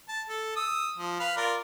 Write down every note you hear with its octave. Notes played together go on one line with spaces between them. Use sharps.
A5
A4
D#6 E6
F3
B4 F5
F4 A#4 D5